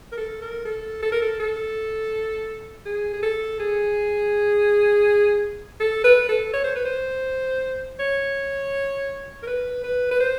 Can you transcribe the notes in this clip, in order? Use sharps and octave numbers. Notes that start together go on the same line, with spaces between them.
A#4
A4
A#4
A4
A4
A#4
A4
A4
G#4
G#4
A4
G#4
A4
B4
A4
C#5
C5
B4
C5
C#5
A#4
B4
B4
B4
C5